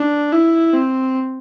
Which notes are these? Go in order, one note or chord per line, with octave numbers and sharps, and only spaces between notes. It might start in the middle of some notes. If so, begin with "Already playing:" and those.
Already playing: D4
E4
C4